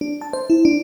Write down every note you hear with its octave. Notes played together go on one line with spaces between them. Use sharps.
D4
A5
C5
E4
D4